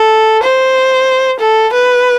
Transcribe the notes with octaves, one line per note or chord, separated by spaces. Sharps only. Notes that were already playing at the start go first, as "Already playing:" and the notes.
Already playing: A4
C5
A4
B4